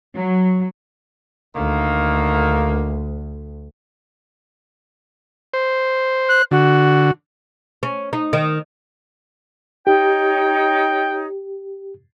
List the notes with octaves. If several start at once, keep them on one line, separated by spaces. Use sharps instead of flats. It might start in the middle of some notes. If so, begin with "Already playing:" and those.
F#3
D2 D3 D#3 A#3
C5
F#6
D3 F#4
C#4
D#4
D#3
D#4 G4 C#5 G5